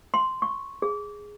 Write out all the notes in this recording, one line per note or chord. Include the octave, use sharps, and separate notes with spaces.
C6
C#6
G#4